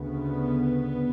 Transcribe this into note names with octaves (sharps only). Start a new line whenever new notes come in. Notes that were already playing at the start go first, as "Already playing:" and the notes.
Already playing: D2 C#3 B3